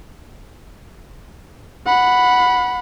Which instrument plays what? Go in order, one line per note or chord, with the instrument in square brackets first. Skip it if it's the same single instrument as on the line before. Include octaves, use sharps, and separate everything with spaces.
[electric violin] F#5 B5